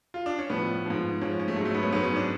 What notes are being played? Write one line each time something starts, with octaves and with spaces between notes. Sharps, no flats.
F4
D4
C#4
A2 F3 B3
G#2 F3
G#2 F3 C#4
C#4
A3
G#2 F#3 G#3
A3
B3
C#4
G#2 F#3 B3
C#4
D4